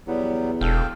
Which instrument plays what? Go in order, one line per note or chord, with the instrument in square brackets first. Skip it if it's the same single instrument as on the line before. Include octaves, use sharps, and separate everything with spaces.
[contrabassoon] E2 [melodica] F#3 G3 B3
[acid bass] E1 [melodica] A4 F5 G5